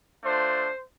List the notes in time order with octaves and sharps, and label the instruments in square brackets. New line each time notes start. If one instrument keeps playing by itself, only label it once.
[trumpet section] A3 D4 F4 C5